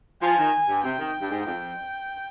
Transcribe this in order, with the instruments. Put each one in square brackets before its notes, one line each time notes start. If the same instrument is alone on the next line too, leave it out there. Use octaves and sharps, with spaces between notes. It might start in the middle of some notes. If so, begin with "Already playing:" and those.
[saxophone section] F3 [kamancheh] G#5
[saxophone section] D#3
G2
[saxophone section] C3 [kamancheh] G5
[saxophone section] D#3
G2
G#2
[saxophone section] F2 [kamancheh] G5